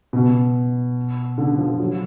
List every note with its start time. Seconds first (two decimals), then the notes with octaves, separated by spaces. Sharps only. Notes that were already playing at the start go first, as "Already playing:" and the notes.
0.13 B2
1.38 D3
1.58 F3
1.80 F#3